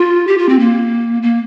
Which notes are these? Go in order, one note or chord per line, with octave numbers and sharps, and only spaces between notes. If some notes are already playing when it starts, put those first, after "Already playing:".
Already playing: F4
G4
F4
C4
A#3
A#3